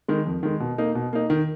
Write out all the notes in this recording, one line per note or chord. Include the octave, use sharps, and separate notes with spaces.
D#3 G#3
F2
D#3 G#3
B2
A#3 D#4
B2
A#3 D#4
D#3